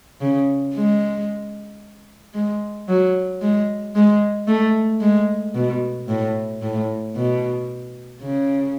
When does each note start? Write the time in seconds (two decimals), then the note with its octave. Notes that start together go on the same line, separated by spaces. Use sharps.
0.21 C#3
0.74 G#3
2.34 G#3
2.88 F#3
3.41 G#3
3.95 G#3
4.47 A3
5.01 G#3
5.55 B2
6.08 A2
6.62 A2
7.15 B2
8.21 C#3